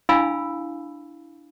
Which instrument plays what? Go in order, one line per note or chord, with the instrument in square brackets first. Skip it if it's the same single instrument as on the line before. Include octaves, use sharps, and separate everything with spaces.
[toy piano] D4 E4 F5 G#5 B5 E6